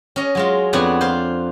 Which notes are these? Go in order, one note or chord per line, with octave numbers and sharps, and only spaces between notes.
C#4 D#5
F#3 G#3 F4
F2 B3 D4 C#5 F#5 G#5
F4 C5